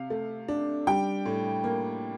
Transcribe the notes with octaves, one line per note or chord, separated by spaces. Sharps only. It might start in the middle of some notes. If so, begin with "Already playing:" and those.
Already playing: C3 F5
A3
D4
G3 G5
A2
A#3